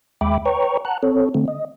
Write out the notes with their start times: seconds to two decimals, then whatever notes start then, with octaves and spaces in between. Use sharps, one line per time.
0.21 D#2 G#3 E5 G5 B5 D6
0.46 B4 C#5 G5 A#5 C#6
0.85 F#5 A5 A#5 F#6
1.03 C4 A4 C#5
1.34 D3 A3 C4
1.48 D#5